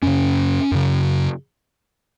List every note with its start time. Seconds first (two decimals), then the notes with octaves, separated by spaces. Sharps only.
0.02 F#2 C#3 C#4
0.72 F#2 C#3